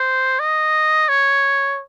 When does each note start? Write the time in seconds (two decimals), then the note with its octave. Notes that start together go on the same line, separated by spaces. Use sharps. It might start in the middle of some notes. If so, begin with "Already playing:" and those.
Already playing: C5
0.40 D#5
1.09 C#5